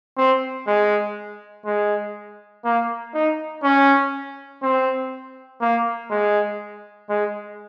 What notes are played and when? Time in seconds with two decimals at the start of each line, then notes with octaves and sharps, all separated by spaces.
0.17 C4
0.67 G#3
1.66 G#3
2.65 A#3
3.14 D#4
3.63 C#4
4.63 C4
5.61 A#3
6.11 G#3
7.09 G#3